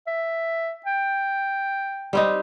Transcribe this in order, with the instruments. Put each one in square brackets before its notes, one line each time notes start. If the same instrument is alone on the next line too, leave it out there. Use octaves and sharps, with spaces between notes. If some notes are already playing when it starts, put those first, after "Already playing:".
[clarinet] E5
G5
[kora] G3 C4 D#4